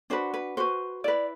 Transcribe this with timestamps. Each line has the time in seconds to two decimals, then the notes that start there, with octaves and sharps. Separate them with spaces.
0.10 D4 F#4 B4 C5
0.34 B4
0.57 F#4 B4 C5
1.04 E4 B4 D5